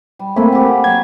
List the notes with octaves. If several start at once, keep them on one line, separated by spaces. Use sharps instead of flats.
G3
A3 A#3 C4 F5 G#5 B5
G4 F#5
F#3 G#6